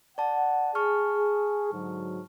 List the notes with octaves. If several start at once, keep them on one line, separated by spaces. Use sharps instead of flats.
D5 F#5 A5
G#4 A5 C#6 F6
G#2 D3 F#3